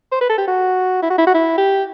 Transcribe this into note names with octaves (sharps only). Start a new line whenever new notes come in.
C5
B4
A4
G4
F#4
E4
F#4
E4
F#4
E4
G4